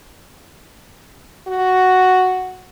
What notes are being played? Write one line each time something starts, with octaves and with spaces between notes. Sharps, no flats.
F#4